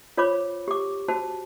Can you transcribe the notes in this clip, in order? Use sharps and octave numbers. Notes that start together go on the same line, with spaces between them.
F4 C5 C#5 B5 D6
G4 D6
F#4 C5 A5